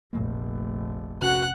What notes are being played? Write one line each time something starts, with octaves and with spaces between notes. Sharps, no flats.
F1 A#1 A#2 A3 A#3
C3 C#4 F#4 F#5 F#6